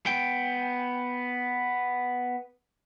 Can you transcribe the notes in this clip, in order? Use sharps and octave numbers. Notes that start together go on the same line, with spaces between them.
B3 G5